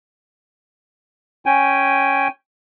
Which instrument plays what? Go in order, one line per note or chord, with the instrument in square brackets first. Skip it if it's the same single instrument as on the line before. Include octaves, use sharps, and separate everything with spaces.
[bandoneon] C#4 G5 G#5